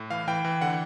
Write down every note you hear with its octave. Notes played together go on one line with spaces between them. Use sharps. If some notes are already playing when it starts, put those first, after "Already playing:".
Already playing: A2
E3 F5
E3 G5
E3
D3 F#5